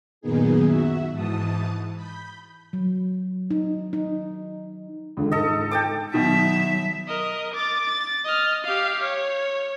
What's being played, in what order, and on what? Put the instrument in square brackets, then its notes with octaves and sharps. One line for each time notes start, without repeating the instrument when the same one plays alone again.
[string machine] F#2 A#2 D#3 B3 D#4 G#4
F#4 E5
G#2 E3 A5 D#6
B5 G6
[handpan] F#3
D#4
D#4
[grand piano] C#2 D3 D#3
[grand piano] G#2 [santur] A4 D#5
[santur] G5 A5 D6
[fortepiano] B2 D#3 [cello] F#3 E5
[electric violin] A#4 D#5
D6 A6
A6
D#5 F6
G4 F5
C#5